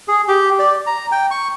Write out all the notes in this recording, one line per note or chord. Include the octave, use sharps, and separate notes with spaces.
G#4
G4
D5
A#5
G5
C#6